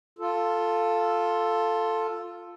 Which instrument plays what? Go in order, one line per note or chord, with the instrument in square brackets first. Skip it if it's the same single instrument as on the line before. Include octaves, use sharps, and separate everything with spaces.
[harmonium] F4 A4